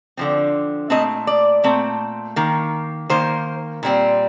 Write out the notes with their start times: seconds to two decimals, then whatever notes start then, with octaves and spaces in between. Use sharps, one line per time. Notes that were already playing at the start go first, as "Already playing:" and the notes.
0.17 D3 F3 C4
0.90 A#2 A3 C4 D#5
1.27 D5
1.64 A#2 A3 C4
2.36 D#3 A#3
3.09 D#3 A#3 C5
3.83 A#2 G3 C4